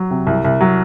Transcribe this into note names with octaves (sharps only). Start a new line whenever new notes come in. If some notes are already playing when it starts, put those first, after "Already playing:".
Already playing: F#3
C3
C2
C2
F#3